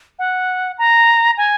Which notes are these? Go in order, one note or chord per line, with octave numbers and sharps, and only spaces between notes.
F#5
A#5
G#5